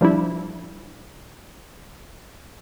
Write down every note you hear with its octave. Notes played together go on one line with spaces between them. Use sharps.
F3 G3 D4 E4